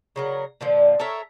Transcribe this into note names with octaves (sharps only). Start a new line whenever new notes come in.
C#3 F#3 A#4
A#2 D3 F3
A4 A#4 C#5 E5